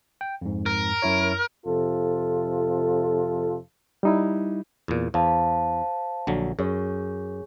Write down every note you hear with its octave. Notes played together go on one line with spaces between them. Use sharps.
G5
F2 G#2
A#4
F#2 E4 C#5
F2 C3 F4 A4
G3 D#4 E4
E2 A#2
E2 C5 F5 A5
A#1 D3 F#3
F#2 G#4 C#5